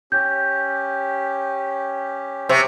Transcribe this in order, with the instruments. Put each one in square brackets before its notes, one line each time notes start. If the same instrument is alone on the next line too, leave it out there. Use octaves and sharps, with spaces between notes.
[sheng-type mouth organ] C#4 G4 [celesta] G6
[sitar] C3 [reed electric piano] C5 C#6